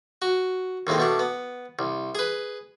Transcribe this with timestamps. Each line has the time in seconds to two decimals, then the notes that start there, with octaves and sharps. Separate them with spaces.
0.22 F#4
0.87 D#2 A2 G#3 C4
0.98 B2 A3 D4
1.19 B3
1.79 C2
2.15 G#4 B4